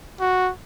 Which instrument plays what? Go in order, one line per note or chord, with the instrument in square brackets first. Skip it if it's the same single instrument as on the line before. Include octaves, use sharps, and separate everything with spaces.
[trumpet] F#4